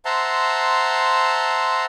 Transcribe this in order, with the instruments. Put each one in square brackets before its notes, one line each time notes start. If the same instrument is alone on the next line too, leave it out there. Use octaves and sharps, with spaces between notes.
[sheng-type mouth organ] C5 E5 F#5 A5 A#5 C6